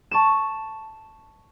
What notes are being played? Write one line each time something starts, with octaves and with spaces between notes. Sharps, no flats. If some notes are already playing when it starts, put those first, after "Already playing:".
A5 C#6 D#7 E7